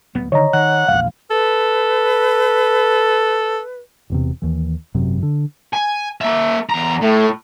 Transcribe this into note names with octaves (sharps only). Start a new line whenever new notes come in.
D1 B3
D3 D#3 C#5 D#5 A#5
D#3 F#5
E1 A#1 F5
A4 B4
E1 E2 C3
D#2 E3
G#1 F#2 C3
D3
G#5
A#3 E5
E2 A#5
A2 A3